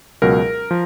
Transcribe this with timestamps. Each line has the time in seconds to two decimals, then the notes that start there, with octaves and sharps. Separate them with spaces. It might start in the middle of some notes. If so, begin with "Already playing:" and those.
0.22 C#2 B2 F#3 A#4
0.71 F3